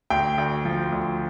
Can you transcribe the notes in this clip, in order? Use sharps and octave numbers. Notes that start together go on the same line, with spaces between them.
D2 G5
D2
F3
D2